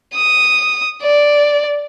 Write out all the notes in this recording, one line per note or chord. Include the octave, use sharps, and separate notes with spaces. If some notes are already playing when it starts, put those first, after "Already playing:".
D#6
D5